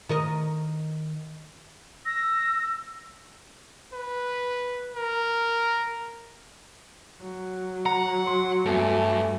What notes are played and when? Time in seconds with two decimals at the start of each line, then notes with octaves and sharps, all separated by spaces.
0.09 D#3 A#4 D#5
2.06 E6 A#6
3.93 B4
4.95 A#4
7.21 F#3
7.86 F#5 A#5
8.27 C6
8.66 E2 G2 A3 A4